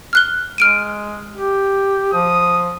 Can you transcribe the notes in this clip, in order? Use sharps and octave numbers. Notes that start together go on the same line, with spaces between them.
F6 F#6 G7
G#3 F6 D7 D#7
G4
F3 D#6